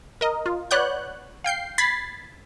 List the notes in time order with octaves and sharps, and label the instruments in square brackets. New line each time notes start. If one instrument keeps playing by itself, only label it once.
[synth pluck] A#4 D#5
F4
B4 C#5 D5 F#5 F#6 G6
F5 G5 G6 C7
B5 G#6 A6 B6 C7